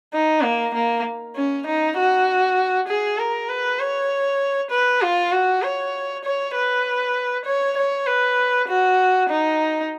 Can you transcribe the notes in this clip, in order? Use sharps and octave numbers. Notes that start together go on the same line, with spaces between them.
D#4
A#3
A#3
C#4
D#4
F#4
G#4
A#4
B4
C#5
B4
F4
F#4
C#5
C#5
B4
C#5
C#5
B4
F#4
D#4